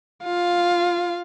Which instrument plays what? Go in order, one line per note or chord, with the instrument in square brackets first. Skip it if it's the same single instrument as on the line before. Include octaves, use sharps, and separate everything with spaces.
[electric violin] F4 F5